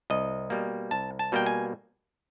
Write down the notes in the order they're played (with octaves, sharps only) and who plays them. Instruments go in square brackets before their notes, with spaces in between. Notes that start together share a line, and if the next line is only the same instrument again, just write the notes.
[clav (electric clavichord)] C2 D#5
B2 G3 A#3
C2 A5
A5
B2 G3 A#3 G5
G#5